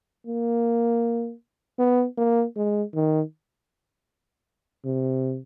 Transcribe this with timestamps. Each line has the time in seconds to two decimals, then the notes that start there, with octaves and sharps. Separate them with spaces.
0.26 A#3
1.79 B3
2.17 A#3
2.56 G#3
2.94 D#3
4.85 C3